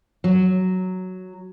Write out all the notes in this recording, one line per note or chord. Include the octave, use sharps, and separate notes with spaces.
F#3